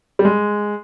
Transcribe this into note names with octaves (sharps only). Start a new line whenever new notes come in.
G3
G#3